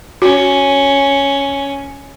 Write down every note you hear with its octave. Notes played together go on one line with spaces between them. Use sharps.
C#4 F#4